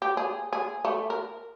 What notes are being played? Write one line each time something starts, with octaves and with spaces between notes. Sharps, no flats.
G4
G#4
G#4
A3
A#4